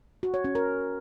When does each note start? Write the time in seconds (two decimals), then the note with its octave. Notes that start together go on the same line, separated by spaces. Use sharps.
0.23 F#4
0.34 C#5
0.44 C#4
0.55 A#4